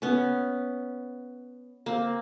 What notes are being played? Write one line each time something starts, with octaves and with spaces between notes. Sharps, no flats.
B3 C#4
A#3 C4